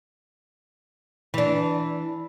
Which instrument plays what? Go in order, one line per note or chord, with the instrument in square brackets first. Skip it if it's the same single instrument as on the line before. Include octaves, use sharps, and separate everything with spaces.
[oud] E3 D4